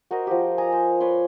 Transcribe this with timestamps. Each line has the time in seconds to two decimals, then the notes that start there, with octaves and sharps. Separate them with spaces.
0.11 F#4 A#4 C5 D#5
0.27 F3 G4
0.58 D#5 G#5 A#5 D#6
0.72 C5
1.00 B4 C#5 D5 C6